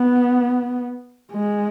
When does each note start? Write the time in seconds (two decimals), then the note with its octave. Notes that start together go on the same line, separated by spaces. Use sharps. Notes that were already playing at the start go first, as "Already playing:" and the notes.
Already playing: B3
1.32 G#3